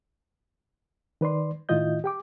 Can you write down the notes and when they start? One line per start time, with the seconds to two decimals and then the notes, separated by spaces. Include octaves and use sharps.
1.21 D#3 B4 D5 C6
1.69 A2 D#3 E4 F4 D#5 G6
2.04 G4 G5 D6